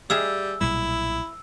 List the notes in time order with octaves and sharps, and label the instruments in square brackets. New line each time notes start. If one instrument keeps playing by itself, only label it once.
[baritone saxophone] G3 [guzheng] G#4 E5 F5 [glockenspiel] E6
[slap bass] B1 A#2 G3 [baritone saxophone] E4